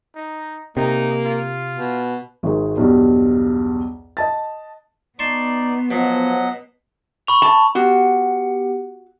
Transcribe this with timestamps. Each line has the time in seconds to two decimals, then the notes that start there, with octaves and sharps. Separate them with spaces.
0.15 D#4
0.77 C3 A#3 D#4
1.25 F4
1.76 B2
2.43 G#1 D#3 G#3
2.77 B1 E2 G2
4.17 D#5 A5 A6
5.19 B3 D#4 D5 A5 C6 C#6
5.91 B2 F3 F#3 D#5 F#5
7.27 B5 C#6 F7
7.42 A5
7.75 B3 F#4 G4 F#5